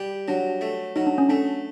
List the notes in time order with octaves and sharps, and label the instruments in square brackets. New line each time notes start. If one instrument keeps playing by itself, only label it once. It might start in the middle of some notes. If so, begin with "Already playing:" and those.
Already playing: [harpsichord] G3
[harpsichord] F#3 [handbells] D4
[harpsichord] A3
[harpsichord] F#3 [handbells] D#4
[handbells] D4
C#4
[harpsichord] A3 [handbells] D4